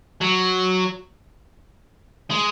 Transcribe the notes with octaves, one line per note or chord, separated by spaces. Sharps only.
F#3
G#3